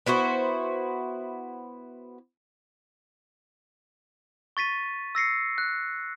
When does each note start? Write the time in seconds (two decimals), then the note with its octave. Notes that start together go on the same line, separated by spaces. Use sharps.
0.06 B3 E4 F#4 C5
4.57 C#6 A6 B6 D#7
5.15 E6 A#6 C7 C#7
5.58 F#6